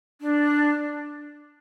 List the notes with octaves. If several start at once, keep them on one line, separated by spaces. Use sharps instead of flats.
D4